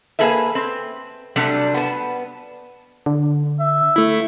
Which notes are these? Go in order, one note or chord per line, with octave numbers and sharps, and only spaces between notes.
A#3 G#4 A4 B4 E5
C4
C3 F#3 G3 A3 D4 A4
B3 A5
D3
E5
A3 E4